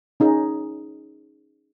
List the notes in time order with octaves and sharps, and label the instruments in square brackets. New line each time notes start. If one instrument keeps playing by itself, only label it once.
[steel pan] C#4 D#4 G#4